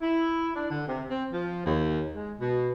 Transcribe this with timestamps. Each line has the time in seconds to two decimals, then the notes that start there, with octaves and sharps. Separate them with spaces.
0.01 E4
0.55 D4
0.70 D3
0.87 C3
1.10 C4
1.32 F3
1.65 D#2
2.14 G#3
2.40 B2